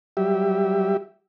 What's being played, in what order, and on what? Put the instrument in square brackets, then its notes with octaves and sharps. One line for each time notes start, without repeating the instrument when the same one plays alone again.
[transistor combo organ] F#3 G3 G4 E5